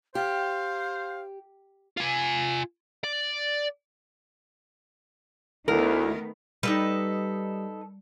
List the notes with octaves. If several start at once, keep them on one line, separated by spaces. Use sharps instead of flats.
G4 C5 F5
F4 G#5
D5
D2 D#3 A3 B3 E4 A#4
G3 D#4 A4 B4